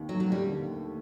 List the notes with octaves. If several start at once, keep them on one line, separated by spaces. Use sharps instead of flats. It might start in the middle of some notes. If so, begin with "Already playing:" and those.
Already playing: D#2 D#3
F#3 A3
F#3
D#2
G3
D3
D#2
A3